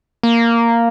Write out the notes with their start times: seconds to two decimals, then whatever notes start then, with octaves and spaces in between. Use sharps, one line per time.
0.23 A#3